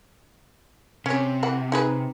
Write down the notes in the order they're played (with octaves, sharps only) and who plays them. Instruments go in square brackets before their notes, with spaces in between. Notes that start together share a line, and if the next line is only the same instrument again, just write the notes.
[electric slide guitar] C3 [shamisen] C#4 C#5
[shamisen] E3 E4 F#5
D#4 G#4 B4